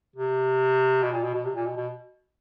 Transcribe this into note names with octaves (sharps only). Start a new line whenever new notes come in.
C3
B2
A#2
B2
B2
C3
A#2
B2
B2